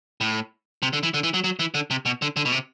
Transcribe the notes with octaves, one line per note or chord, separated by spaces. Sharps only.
A2
C3
D3
E3
D3
E3
F#3
F#3
E3
D3
C3
B2
D3
D3
B2
C3